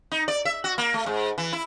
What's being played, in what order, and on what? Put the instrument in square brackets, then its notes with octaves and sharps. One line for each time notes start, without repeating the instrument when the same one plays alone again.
[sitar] D#4
D5
E5
F#4
A#3
A3
G#2
E3
E4